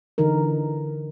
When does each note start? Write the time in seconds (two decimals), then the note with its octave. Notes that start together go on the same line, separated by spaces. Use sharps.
0.18 D3 E3 D#4 A#4